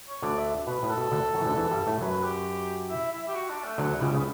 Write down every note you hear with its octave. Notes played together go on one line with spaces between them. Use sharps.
C#5
D2 D3 D5
E5
B2 B4
A2
A4
B2
D2 D3
F#2 F#3
E3
D2 D3
E2 E3
G2 G3
A2 A3
F#2 F#3 B4
G4
E4
E4
G4
F#4
D4
A3
D2 D3 F#3
C#2 C#3 G3
C#3 B3